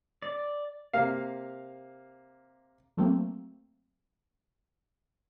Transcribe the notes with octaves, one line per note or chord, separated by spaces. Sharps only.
D5
C3 A#3 F5
F#3 A3 A#3 C4